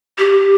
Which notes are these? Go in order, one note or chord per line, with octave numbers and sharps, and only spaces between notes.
G4